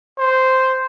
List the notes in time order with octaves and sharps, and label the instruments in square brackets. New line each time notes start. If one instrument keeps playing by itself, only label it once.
[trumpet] C5